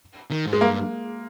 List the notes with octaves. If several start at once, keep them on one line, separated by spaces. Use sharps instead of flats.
D#3
G#2
G#3
G2 A#3